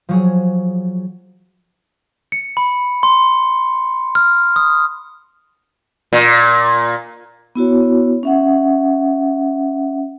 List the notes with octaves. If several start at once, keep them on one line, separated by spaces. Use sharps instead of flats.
F3 F#3 G#4
C#7
B5
C6
F6
D#6
A#2
B3 E4 F#4 C#5
C#4 E5 F#5